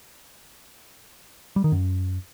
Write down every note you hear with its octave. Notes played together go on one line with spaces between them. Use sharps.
G3
D#3
F#2